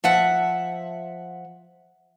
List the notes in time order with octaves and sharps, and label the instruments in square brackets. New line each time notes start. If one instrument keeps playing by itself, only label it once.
[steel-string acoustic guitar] F3 E5 F#5